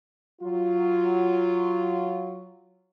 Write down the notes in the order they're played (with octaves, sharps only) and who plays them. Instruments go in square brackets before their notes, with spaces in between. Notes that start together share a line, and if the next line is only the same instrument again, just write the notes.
[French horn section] F#3 F4